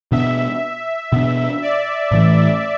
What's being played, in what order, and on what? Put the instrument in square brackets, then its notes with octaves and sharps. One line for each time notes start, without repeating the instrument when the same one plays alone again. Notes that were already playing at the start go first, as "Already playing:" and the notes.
[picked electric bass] B2 B3 D4 [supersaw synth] E5
[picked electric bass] B2 B3 D4
[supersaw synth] D5
[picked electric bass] A2 E3 A3